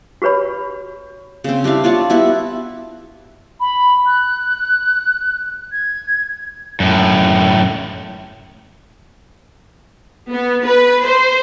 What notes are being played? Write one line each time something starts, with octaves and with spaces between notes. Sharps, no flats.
F#4 G4 B4 C#5 B5
C#3 C4
G3 D4 E4 F5
D4 F4 C#5 A5
G3 B3 E4 F#4
B5
F#6
G#6
F#2 A2
B3
B4
C5